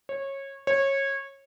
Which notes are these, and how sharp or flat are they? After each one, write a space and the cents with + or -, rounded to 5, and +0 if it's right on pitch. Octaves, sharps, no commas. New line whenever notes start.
C#5 -20
C#5 -20